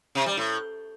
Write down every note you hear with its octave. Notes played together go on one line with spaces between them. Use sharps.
C3
G3
A2